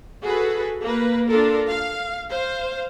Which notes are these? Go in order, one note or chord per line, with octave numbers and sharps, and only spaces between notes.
F#4 G#4 A4 B4
A#3 B4
D4 F4 A4 A#4
F5
C5 F5